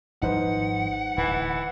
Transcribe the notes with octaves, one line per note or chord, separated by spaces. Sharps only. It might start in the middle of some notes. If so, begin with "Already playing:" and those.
G#1 F3 G3 D#4 B4 C5 F#5
D1 E3